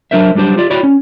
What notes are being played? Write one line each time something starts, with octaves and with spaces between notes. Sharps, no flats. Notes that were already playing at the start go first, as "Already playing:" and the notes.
F#3 D4 A#4 C5 E5
F#3 G3 D4 G4 C5
F4 G4 D5
E4 F#4 C#5 D5 G5 B5
C#4